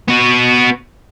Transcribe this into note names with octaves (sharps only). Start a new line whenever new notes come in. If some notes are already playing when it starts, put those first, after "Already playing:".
B3 F#4